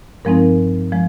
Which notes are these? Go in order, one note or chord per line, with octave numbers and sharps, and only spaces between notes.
G2 F3 G#3 C4 D#4 A#4
F3 G#3